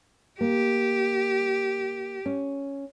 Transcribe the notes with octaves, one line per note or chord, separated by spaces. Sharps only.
A#3 G4
C#4